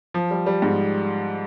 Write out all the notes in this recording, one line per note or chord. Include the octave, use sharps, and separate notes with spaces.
F3
G3
G3
G#2